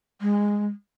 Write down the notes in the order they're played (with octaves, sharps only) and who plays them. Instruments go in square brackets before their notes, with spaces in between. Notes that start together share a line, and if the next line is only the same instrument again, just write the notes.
[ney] G#3